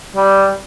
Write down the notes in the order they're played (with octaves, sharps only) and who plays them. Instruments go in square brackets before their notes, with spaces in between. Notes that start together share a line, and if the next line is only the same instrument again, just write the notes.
[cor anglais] G3